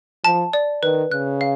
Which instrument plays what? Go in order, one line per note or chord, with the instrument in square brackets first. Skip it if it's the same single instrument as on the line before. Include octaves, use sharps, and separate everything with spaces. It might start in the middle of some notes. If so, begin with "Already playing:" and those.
[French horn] F3 [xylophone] A5
[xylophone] D5
[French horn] D#3 [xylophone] B4
[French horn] C#3 [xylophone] F#6
[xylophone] F5